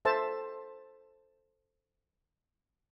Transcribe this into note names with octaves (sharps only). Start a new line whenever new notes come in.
A4 C5 E5 A5